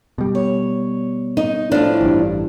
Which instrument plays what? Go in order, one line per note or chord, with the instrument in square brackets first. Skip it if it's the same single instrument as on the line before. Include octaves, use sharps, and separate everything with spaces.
[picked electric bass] B2 G3
[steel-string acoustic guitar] C#5
[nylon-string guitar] D#4
[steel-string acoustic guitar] A2 F3 [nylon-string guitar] D4
[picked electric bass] A1 G2